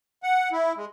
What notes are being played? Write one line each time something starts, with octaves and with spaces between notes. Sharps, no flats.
F#5
E4
G#3